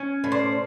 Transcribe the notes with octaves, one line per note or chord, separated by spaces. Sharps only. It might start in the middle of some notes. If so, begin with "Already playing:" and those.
Already playing: C#4
A2
C5 D5